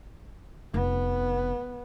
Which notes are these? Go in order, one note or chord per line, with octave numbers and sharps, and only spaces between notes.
F1 B3